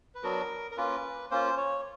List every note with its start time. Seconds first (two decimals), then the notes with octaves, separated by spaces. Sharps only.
0.15 B4
0.23 F#3 B3 D4 F#4 A#4
0.71 A#4
0.77 A#3 C#4 F4 B4
1.31 A#3 C#4 F4 C5
1.57 C#5